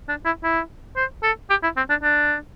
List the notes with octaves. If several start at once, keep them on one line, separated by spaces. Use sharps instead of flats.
D4
E4
E4
C5
A4
G4
E4
C4
D4
D4